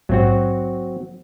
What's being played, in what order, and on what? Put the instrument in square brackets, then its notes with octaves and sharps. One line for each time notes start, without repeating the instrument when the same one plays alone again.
[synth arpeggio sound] A#1 G#2 [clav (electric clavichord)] F#3 C4 F#4